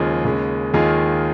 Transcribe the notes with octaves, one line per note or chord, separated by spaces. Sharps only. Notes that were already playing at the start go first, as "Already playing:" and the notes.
Already playing: D#2 C#3 F3 G#3 F4 G#4
D#2 C#3 G#3
D#2 D#3 G#3 F4 G#4